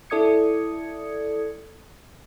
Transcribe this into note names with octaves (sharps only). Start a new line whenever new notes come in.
E4 A4 D5 D#6 G#6 C#7